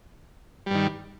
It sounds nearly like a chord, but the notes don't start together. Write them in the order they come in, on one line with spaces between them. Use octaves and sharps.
G3 G2 D#3